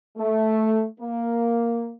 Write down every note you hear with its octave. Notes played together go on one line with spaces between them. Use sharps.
A3
A#3